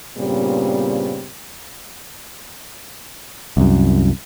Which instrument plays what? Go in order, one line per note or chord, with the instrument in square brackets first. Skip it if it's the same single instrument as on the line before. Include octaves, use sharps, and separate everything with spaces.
[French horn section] G2 A#2 C#3 G3 B3 C4
[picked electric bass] C2 F#2